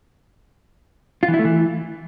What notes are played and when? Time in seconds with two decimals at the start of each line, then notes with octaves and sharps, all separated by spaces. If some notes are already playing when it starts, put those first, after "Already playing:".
1.23 F4
1.28 E3
1.34 E4
1.39 A3
1.45 E3